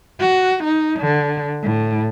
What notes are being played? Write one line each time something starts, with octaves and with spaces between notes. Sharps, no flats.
F#4
D#4
D3
A2